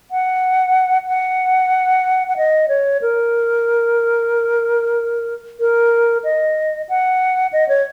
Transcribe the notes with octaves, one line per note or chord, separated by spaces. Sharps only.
F#5
F#5
F#5
D#5
C#5
A#4
A#4
D#5
F#5
D#5
C#5